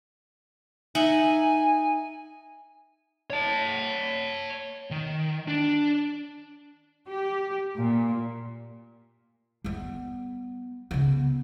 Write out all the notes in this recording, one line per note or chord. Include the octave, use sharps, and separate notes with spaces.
D#4 E5 F#5 G#5
C#5 A5
D#3
D4
G4
A#2
G3 B3
C#3 B3